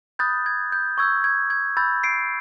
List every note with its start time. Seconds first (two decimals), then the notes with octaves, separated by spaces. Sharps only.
0.19 B5 D#6 F#6 G6 A6
0.46 G#6
0.72 G6
0.98 C#6 E6 G6 G#6
1.24 G#6
1.50 G#6
1.77 B5 E6 G6 A6
2.04 C7 D7